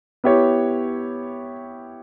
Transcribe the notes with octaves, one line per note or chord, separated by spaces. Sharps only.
B3 E4 G4 C#5